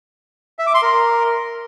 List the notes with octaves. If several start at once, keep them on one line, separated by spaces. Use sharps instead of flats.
E5
D6
C6
A#4